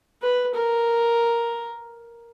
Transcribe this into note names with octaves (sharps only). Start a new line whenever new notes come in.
B4
A#4